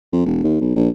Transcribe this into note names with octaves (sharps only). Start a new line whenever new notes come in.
F2
E1
D#2
B1
A#1